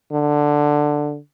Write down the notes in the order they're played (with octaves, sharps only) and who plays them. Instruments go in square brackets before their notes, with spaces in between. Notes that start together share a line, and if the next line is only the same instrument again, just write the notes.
[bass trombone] D3